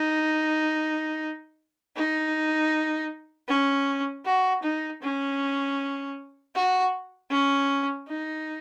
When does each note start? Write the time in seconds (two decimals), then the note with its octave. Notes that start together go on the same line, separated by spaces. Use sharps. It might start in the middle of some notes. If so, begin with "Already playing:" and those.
Already playing: D#4
1.96 D#4
3.49 C#4
4.26 F#4
4.63 D#4
5.02 C#4
6.55 F#4
7.31 C#4
8.08 D#4